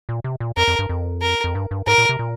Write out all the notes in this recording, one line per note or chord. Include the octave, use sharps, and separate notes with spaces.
A#2
C3
A#2
F2 A#4
F2
G2
F2
A#4
F2
G2
G2
G#2 A#4
A#2
C3
A#2